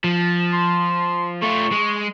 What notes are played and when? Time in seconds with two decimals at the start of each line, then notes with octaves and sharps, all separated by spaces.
0.04 F3
0.53 C6
1.42 A3 F4 C#6
1.72 G#3